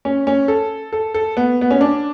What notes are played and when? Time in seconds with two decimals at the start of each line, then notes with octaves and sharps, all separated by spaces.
0.05 C#4
0.27 C#4
0.48 A4
0.92 A4
1.14 A4
1.37 B3
1.61 B3
1.71 C#4
1.81 D4